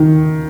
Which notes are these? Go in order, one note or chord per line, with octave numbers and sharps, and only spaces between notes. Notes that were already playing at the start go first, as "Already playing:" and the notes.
Already playing: D#3